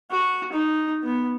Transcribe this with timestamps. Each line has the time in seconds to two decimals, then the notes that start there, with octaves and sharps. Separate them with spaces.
0.11 F#4
0.52 D#4
1.03 B3